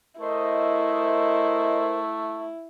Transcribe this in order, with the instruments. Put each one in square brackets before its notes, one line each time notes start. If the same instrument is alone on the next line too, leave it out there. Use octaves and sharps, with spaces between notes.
[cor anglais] A3 [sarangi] E4 [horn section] A#4 C5 [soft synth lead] D#5